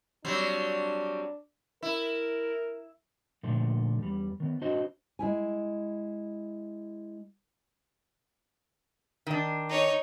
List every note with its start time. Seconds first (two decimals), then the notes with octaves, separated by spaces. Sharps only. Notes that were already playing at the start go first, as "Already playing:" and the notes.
0.25 F#3 G3 C4 D4
1.83 E4 A#4
3.43 A#2 D3 F3 A3
3.99 E2 G3
4.40 D#3 B3
4.61 D4 F#4 C5 D#5
5.19 G#3 E4 G#5
9.27 D#3 D4
9.69 D#4 C#5